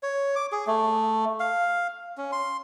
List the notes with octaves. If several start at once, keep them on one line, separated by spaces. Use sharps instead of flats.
C#5
D6
G#4
A3
F5
C#4
C6